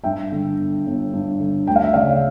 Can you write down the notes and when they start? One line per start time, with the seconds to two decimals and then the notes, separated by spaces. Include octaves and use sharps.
0.04 G2 E5 G5
0.32 D3
0.59 G1
0.86 G1
1.13 G2
1.40 D3
1.67 D2 G5
1.76 F5
1.84 E5
1.93 C#3 D5 F5